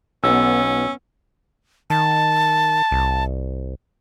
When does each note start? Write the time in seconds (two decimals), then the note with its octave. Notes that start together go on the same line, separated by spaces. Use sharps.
0.24 B1 B3 C#4 E6
1.90 D#3 A5
2.91 C2